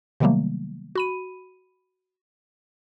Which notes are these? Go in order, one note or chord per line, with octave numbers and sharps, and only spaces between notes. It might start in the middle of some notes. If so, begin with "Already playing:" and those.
C3 D#3 F#3 G3 A3 A#3
F#4 B5 D#7